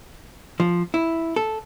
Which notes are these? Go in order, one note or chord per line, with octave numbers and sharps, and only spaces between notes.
F3
E4
A4